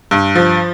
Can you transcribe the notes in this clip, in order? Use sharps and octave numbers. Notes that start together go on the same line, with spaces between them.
G2
F3